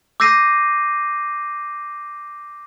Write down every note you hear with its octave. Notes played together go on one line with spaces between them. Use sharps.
D6 E6 G6 A#6 C7 D#7